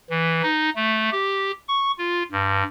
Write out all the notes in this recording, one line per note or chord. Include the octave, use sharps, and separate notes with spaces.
E3
D#4
A3
G4
C#6
F4
G2